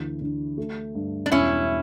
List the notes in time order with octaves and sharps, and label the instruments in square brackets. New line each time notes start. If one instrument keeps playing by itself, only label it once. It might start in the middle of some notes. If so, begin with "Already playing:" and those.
Already playing: [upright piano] D2 E3
D3
A3
G2
[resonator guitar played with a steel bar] D4
[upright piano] E1 [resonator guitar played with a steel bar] C#4 E4